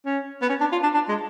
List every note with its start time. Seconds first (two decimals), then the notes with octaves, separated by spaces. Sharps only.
0.06 C#4
0.42 B3
0.49 C#4
0.60 D4
0.72 F4
0.83 D4
0.94 D4
1.08 G#3